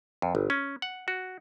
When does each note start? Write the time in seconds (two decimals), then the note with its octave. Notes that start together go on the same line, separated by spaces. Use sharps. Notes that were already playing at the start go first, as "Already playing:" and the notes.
0.22 F2
0.35 G1
0.50 C#4
0.82 F#5
1.08 F#4